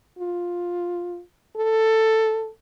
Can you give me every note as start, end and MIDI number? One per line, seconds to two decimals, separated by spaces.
0.19 1.21 65
1.57 2.50 69